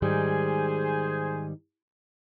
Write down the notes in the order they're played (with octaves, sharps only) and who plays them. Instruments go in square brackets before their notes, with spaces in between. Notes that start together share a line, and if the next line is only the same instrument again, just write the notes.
[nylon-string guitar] G#2 D#3 G3 [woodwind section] G#4 C5 G#5